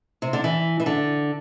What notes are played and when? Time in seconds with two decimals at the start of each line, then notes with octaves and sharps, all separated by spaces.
0.22 C3
0.33 D3
0.44 E3
0.80 E3
0.86 D3